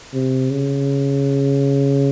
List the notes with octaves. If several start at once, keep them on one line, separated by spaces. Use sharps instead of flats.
C3
C#3